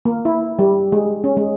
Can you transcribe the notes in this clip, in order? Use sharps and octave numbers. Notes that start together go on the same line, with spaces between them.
A#3
E4
G3
G#3
C#4
G#3